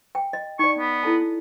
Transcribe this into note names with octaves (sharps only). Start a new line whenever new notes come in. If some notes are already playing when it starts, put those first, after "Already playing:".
G5
D#5
D#4 D5 C#6
B3
E4 A4 A5